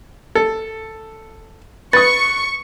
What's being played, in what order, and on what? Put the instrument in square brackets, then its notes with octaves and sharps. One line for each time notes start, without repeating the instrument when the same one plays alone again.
[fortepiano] A4
[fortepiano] B4 D#6 [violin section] C#6 [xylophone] A6